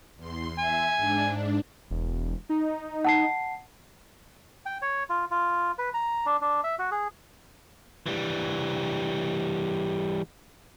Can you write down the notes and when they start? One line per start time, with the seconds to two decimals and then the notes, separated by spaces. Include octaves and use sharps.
0.17 E2 C6
0.58 E5 G#5
0.97 G#2 D4
1.91 E1
2.49 D#4
3.05 F#5 A5 C7
4.66 G5
4.82 C#5
5.09 F4
5.31 F4
5.78 B4
5.94 A#5
6.26 D4
6.41 D4
6.64 E5
6.79 F#4
6.91 G#4
8.06 E3 G3